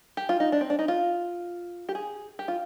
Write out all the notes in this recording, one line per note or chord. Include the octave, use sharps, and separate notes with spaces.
G4
F4
D#4
D4
C4
D4
D#4
F4
G4
G#4
G4
F4